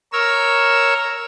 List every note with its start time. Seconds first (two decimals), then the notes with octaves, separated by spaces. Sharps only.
0.12 A#4 C#5 E6